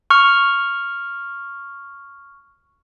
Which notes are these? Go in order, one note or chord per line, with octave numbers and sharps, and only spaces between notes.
C#6 F6